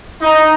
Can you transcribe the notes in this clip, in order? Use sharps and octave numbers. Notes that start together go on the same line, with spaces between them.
D#4